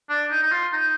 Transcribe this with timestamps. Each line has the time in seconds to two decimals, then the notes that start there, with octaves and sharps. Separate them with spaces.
0.10 D4
0.31 D#4
0.43 D#4
0.52 F4
0.73 D#4